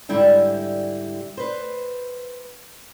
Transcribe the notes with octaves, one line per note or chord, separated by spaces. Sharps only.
G#2 D3 G3 E4 G4 E5
B4 C5